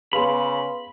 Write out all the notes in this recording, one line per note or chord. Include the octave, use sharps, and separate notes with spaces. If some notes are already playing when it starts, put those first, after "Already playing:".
C#3 B3 G#4 B4 F5 B5 C6